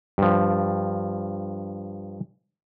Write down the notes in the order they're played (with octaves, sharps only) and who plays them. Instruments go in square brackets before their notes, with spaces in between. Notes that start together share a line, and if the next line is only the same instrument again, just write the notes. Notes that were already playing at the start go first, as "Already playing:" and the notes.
[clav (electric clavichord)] G2 F3